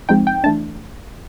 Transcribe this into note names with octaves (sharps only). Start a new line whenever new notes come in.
F3 G#3 C4 D#4 G5
G5
E3 A3 D4 A5